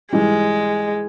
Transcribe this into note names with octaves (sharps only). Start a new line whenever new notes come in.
G#2 E3 G3 G#3